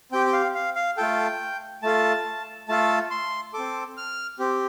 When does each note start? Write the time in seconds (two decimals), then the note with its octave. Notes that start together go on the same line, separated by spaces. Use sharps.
0.12 C4 G4 G5
0.26 G5
0.33 F5
0.55 F5
0.76 F5
0.97 A3 F4 A4 G5
1.83 A3 F4 A4 A5
2.68 A3 F4 A4 A5
3.11 C6
3.54 C4 A4 D6
3.97 F6
4.39 C4 G4